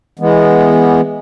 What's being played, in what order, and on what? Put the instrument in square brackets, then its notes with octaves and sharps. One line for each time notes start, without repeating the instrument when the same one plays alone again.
[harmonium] E3 G#3 B3